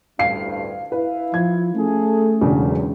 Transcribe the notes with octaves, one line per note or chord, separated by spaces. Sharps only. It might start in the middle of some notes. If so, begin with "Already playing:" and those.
A1 D2 G2 F5 C7
E4 B4 F5
F3 G#6
A3 C#4 G#4 A4
E1 A#1 E2 C#3 F#3 D4